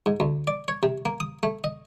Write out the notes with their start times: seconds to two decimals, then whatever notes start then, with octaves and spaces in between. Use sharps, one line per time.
0.06 G#2
0.20 D2
0.47 D5
0.68 C#5
0.83 C3
1.05 A#3
1.20 D#6
1.43 A3
1.64 D#5